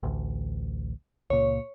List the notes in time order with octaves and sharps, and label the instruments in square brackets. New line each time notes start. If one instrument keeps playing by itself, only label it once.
[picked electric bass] A1 D2
[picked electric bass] C#2 A#2 [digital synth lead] C#5